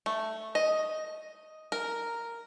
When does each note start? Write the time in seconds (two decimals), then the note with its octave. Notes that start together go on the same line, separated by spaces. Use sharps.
0.06 A3
0.55 D#5
1.72 A#4